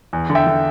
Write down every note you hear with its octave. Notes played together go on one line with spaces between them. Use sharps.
E2
D3
E5 G5
D3